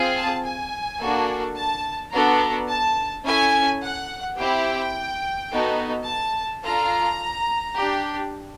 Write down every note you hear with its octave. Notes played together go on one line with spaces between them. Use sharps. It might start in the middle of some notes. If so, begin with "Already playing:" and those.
Already playing: C4 F4 G#4
A5
G#5
A#3 D4 F#4 A4
A5
B3 D4 F#4 A4 A#5
A5
C#4 E4 A4 G#5
F#5
C4 E4 G4 G5
B3 D#4 F#4 A4
A5
D4 F4 A4 A#5
D4 G4